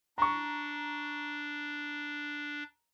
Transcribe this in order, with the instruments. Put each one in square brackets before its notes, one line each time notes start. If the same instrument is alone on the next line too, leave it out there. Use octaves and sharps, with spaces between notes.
[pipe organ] D4 [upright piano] A#5 C#6